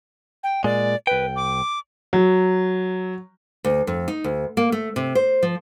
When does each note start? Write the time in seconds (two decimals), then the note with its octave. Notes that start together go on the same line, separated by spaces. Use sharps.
0.43 G5
0.64 A#2 G#3 D5
1.07 C2 B4 G5
1.36 D6
2.13 F#3
3.64 D2
3.87 F2
4.08 D#4
4.24 D2
4.57 A#3
4.72 A3
4.96 C3
5.15 C5
5.43 F3